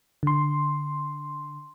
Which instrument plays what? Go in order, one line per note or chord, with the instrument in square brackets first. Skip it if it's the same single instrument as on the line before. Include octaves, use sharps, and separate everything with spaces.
[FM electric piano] D3 C6